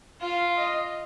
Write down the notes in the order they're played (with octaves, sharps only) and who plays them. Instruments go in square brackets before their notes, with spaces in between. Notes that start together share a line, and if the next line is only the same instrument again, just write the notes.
[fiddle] F4 [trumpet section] F5
[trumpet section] D#5